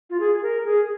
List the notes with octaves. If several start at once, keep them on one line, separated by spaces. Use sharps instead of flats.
F4
G#4
A#4
G#4